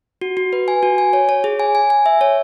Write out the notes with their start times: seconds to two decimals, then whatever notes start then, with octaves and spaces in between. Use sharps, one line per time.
0.21 F#4
0.37 F#4
0.53 B4
0.68 G#5
0.83 F#4
0.98 G#5
1.13 C#5
1.29 C#5
1.44 G#4
1.60 G#5
1.75 G#5
1.90 G#5
2.06 E5
2.21 C#5